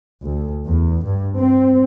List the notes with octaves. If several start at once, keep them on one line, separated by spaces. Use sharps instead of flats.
D2
E2
G2
C4